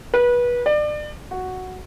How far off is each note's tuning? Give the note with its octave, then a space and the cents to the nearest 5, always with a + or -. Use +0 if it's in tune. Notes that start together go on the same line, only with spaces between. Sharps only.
B4 -25
D5 +30
F#4 +0